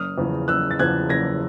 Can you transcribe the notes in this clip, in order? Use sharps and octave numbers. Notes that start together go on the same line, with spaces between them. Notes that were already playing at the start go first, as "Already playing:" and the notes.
Already playing: F#1 D#6 F6
E2 C#3 F3
F#1 E6 F#6
A6
E2 C#3 F3 F#6 G#6
F#1 G#6 A#6